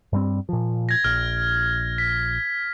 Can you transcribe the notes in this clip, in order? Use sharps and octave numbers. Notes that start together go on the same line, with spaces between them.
G2 G3 C4
A#2 F3
G#6 A#6
A#1 F6
B6